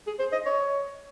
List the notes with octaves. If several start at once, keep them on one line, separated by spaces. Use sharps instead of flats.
G#4
C5
D#5
C#5